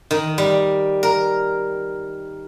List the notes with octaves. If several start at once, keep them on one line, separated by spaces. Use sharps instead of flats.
D#3
G3
A#4